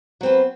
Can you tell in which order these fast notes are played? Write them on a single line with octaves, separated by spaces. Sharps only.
F#3 C4 B4